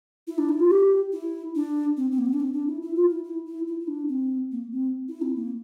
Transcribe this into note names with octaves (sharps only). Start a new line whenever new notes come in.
E4
D4
E4
F4
G4
E4
D4
C4
C4
A#3
C4
D4
C4
D4
E4
E4
F4
E4
E4
E4
E4
E4
D4
C4
A#3
C4
E4
C4
A#3